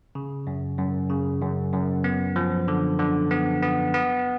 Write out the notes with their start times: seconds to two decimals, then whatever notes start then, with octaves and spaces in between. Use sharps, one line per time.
0.15 C#3
0.47 F#2
0.78 F#2
1.10 C#3
1.42 F#2
1.73 F#2
2.04 B3
2.36 F3
2.68 D3
2.99 D3
3.31 B3
3.62 B3
3.94 B3